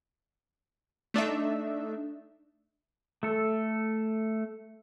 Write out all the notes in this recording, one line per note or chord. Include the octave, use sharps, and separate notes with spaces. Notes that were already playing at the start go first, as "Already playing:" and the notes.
A3 D4 D#4 E5
A3 A4